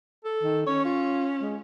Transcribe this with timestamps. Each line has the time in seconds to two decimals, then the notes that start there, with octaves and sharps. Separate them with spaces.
0.25 A4
0.43 D#3
0.67 C#4 C#5
0.85 F4
1.42 G#3